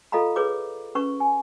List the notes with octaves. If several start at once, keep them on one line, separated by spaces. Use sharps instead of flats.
F4 A4 D#5 F5 A#5 B5
G#4 B4 C#5 D6
C#4 B4 C#6
G#5